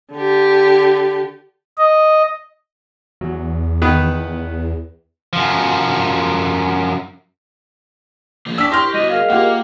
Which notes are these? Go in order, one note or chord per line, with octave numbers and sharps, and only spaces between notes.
D3 G4
D#5
E2 F#3
D#3 B3 B4
F#2 F3
F3 A#3
D4 D5 G5 C#6 D#6 E6 B6
E4 G4 C5 C6 C#6 F6 A#6
G3 B3 F#4 D#5
G#4 A#4 D#5 F5
A#3 F4 G4 F#5